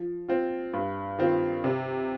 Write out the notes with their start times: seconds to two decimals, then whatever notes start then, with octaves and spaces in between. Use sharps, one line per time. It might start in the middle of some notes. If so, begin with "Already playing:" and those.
Already playing: F3
0.28 C4 F4
0.73 G2
1.18 D#3 C4 F4
1.64 C3